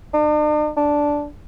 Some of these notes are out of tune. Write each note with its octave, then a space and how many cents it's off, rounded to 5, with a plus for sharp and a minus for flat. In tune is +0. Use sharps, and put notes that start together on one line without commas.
D4 +45
D4 -5